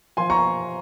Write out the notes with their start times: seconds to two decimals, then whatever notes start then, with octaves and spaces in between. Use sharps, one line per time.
0.17 F3 G#5 C6
0.30 A#5 C#6